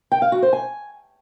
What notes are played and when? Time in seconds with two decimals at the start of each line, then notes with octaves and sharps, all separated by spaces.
0.12 G5
0.22 F5
0.32 F#4
0.42 C5
0.53 G#5